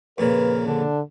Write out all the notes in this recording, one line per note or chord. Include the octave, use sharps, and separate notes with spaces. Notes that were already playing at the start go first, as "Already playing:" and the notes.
F2 A#2 C#3 A#4 B4
D3 D4